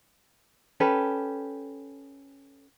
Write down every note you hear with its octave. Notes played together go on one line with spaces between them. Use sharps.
C#4 G4 A4 B4